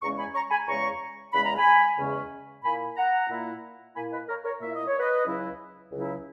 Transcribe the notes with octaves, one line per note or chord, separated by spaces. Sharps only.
E2 C#3 G#3 C#4 A#5 C#6
G#5 B5
A#5 C#6
G#5 B5
E2 C#3 G#3 C#4 A#5 C#6
E2 C#3 G#3 C#4 B5
A#5
G#5 B5
E2 C#3 G#3 C#4
A#2 A#3 E4 G#5 B5
F#5 A#5
A#2 A#3 E4
A#2 A#3 E4 G#5 B5
B4 D#5
A#4 C#5
A#4 C#5
A#2 A#3 E4 E5
D#5
C#5
B4 D#5
C#2 C#3 F#3 C#4 E4
C#2 C#3 F#3 C#4 E4